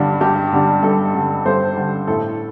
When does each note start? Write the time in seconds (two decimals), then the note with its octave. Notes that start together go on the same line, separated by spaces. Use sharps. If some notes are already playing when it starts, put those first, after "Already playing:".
Already playing: G2 D3 G3 D4
0.21 G2 G4
0.52 D3 G3 D4
0.83 G2 A4
1.14 D3 G3 D4
1.45 G2 A4 C5
1.76 D3 G3 D4
2.07 A2 A4